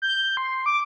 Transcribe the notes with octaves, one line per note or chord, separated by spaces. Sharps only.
G6
C6
D6